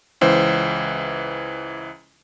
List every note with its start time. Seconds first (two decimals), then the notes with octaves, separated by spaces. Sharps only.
0.21 C#2 E3 C5